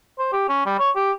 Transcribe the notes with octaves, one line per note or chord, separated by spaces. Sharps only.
C5
G4
C#4
G3
C#5
G4